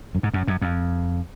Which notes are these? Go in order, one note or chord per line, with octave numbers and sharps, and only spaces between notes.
F#2
G#2
F#2
F#2
F2